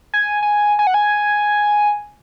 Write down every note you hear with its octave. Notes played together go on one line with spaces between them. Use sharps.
G#5
G#5
G#5
F#5
G#5